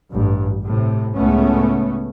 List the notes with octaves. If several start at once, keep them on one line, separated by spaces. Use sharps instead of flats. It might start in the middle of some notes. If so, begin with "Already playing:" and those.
A1 G2
A2 C3
C#2 A2 C#3 A3 B3 C#4